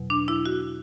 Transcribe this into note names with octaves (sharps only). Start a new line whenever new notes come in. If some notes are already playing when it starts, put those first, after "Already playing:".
Already playing: E2 B2 F#3
D4
E4
F#4